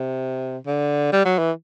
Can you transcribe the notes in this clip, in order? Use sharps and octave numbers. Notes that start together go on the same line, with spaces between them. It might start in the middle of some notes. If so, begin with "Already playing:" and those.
Already playing: C3
D3
G3
F#3
E3